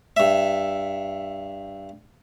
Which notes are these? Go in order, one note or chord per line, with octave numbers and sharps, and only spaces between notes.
G2 E5